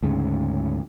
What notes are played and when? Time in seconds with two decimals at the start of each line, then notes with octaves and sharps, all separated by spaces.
0.03 D2 G#2 C#3